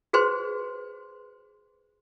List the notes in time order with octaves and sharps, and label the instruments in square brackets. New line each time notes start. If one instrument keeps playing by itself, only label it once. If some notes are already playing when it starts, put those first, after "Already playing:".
[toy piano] F#4 G#4 B4 C5 C6